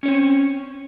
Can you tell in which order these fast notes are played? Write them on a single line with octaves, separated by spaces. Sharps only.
C#4 C#5 C4